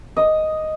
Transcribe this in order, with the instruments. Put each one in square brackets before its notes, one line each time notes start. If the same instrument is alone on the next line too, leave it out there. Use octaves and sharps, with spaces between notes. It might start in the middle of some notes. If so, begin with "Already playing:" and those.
[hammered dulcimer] D#5